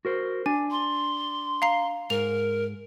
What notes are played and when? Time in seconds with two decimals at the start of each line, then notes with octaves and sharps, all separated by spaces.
0.05 F#4 A#4 C5
0.46 D4 G#5
0.71 C6
1.62 F5 A#5 C7
2.10 G#2 A#4 F7